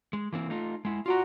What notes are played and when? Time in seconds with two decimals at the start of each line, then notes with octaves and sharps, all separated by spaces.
0.13 G#3
0.33 E3 A#3 C4
0.50 A3 D#4 F4
0.85 G#3 E4
1.06 F4 F#4 D5 A#5